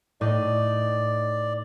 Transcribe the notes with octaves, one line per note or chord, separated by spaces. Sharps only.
A2 D#4 D5 D#5